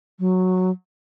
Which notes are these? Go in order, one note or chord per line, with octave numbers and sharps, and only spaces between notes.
F#3